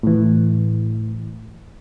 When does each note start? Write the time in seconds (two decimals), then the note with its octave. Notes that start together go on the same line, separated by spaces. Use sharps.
0.03 A2 E3